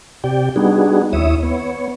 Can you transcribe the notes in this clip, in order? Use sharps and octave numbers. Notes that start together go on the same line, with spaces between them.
C3 G4 D5 G5
G3 B3 D4 D#4 F#4 G#4
D#2 E4 C#5 E5 D#6
B3 C#5